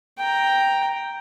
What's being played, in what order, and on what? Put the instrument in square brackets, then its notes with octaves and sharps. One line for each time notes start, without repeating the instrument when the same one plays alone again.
[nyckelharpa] G5 A#5